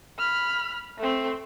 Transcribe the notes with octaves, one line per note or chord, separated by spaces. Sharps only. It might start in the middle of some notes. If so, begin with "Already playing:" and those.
B5 F6
A3 C4